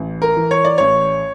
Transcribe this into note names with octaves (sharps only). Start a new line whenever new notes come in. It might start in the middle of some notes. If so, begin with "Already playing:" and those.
Already playing: A1
A#4
E3
C#5
D5
A1 C#5